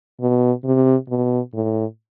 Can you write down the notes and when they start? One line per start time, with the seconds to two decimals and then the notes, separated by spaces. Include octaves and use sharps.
0.21 B2
0.64 C3
1.09 B2
1.54 A2